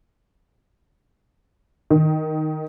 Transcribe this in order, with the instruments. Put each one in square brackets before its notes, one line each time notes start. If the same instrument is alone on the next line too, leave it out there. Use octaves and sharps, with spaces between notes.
[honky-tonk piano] D#3